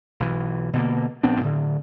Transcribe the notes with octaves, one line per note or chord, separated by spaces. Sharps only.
B1 E3
B2 D3 A#3
A#1 B3 C4 D4
A2 D3